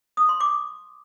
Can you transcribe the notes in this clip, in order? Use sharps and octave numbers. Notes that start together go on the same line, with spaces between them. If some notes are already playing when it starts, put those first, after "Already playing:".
D#6
C6
D6